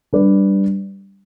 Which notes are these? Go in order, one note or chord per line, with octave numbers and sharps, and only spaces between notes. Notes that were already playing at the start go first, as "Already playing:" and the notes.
G3 D4 B4 D5